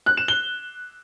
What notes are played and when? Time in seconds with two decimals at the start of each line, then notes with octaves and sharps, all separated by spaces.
0.06 F#6
0.17 E7
0.28 G7